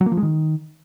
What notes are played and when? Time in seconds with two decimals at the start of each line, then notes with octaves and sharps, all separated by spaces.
0.01 F#3
0.06 A#3
0.12 F3
0.17 G#3
0.23 D#3